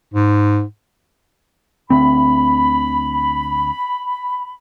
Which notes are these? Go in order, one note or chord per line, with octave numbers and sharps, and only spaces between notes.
G#2
D2 D3 C4 B5